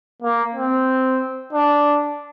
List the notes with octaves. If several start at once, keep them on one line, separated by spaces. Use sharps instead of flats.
A#3
C4
D4